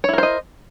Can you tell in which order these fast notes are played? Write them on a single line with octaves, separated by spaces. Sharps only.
C#5 E4 A#4 C5 D#5